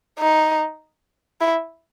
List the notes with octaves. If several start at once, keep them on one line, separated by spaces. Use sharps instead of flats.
D#4
E4